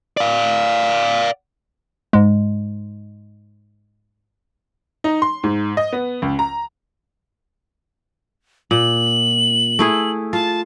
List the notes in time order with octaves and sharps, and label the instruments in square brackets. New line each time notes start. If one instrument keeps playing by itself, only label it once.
[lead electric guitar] D5 F5
[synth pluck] G#2 G#3
[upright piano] D#4
C6
G#2
D#5
B3
C#2
A#5
[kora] A#2 [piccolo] F#7
[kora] A3 E4 G#4
[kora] F4 [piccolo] A5